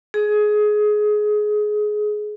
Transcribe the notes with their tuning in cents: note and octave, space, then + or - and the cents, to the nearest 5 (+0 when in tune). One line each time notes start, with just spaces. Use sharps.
G#4 +20